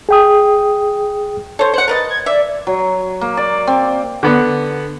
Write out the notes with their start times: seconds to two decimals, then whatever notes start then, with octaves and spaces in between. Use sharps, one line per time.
0.09 G#4 G5 D#6
1.59 A4 C5 C#5
1.74 C5 F#5 C#7
1.88 A#4 B4 D#5 A6
2.10 G#6
2.26 D5 E5
2.67 F#3
3.21 A#3
3.37 D5
3.67 C4
4.23 D3 B3